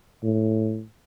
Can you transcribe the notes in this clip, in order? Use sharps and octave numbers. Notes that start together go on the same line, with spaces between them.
A2